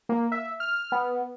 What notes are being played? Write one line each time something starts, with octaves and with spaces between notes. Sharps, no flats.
A#3
E5
F6
B3